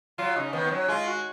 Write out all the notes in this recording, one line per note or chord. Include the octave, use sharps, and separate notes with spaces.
F#3 F4
C#3 D#4
D#3 B3
B3
F#3 C#4
G#3 F4
F#4